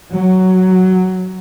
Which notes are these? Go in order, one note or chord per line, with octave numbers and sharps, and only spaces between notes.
F#3